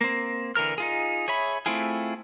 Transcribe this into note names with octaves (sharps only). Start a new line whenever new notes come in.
A#3 C4
D3 E3 A#4 F6
D#4 F4 G#4
G#4 C#5 E5 B5
A3 C4 E4 F4 G#4